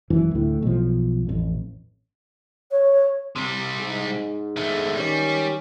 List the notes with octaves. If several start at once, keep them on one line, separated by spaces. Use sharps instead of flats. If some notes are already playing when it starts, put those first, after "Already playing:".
G#1 F#2 E3
D2 A2
B1 F3
A1 F2
C#5
C3 G3
G#2
D#3 A3
D#3 G3 C#4